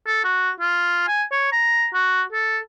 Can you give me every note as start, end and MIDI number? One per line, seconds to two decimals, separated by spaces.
0.07 0.23 69
0.25 0.50 66
0.60 1.07 65
1.08 1.24 80
1.32 1.49 73
1.52 1.87 82
1.94 2.23 66
2.32 2.58 69